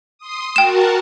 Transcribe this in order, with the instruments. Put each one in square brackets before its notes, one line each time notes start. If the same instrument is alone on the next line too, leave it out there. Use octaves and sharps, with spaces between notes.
[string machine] C6 D#6
[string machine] F#4 A#4 A5 [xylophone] G5 E7